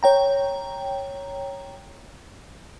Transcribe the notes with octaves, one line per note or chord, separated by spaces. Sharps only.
C#5 G5 A#5